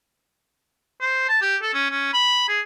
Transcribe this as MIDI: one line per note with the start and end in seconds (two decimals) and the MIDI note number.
1.00 1.28 72
1.29 1.38 81
1.42 1.56 67
1.62 1.72 69
1.74 1.88 61
1.90 2.09 61
2.13 2.47 83
2.48 2.61 68